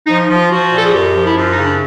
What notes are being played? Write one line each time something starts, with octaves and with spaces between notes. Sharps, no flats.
F3 D#4
F3
F4
F3 F#4
A#2
A4
G#4
F#2 G4
F3
E4
F#2 F4
D#4
C#3
D4